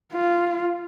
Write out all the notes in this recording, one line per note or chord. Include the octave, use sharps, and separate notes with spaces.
F4